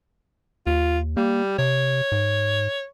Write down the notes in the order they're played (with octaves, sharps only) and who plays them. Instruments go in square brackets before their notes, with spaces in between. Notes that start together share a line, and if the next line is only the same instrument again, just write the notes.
[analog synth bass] D#2 [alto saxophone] F4
[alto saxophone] G3 [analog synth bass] A#3
[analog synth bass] C3 [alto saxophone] C#5
[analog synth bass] G#2